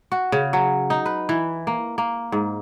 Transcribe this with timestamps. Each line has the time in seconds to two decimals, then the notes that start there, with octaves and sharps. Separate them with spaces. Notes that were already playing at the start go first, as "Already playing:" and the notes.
0.12 F#4
0.32 C#3
0.53 F#3
0.90 D#4
1.06 B4
1.29 E3
1.67 A#3
1.98 A#3
2.32 G#2